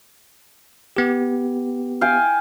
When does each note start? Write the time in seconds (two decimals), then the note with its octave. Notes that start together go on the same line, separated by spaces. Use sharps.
0.97 B3 G4
2.01 F5 G5 G#5